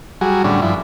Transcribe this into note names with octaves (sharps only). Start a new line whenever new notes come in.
F#3 G3 F#4 G#4
A2 D3 G3 C#4 D4
G2 F3 E4